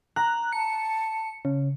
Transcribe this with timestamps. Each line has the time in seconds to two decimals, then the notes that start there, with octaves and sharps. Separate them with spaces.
0.16 A#5 F#6
0.53 A5 C#7
1.45 C#3